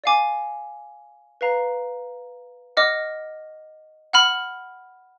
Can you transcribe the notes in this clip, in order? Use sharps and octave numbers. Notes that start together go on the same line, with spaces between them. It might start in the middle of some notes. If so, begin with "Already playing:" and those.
D5 F5 G#5 D6
B4 F5 A#5
D#5 F#5 D6 F6
F#5 B5 F6